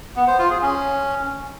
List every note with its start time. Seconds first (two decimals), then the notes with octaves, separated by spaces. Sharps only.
0.16 B3
0.28 C5
0.39 F4
0.50 G#4
0.62 C#4